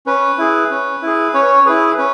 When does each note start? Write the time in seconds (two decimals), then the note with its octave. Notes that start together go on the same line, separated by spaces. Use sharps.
0.06 C#4 B4
0.38 E4 G#4
0.71 C#4
1.02 E4 G#4
1.34 C#4 C#5
1.66 E4 G#4 B4
1.97 C#4 B4